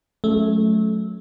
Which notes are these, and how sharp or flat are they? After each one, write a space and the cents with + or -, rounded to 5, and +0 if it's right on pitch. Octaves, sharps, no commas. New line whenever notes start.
F#3 -20 A3 -20 C#4 +0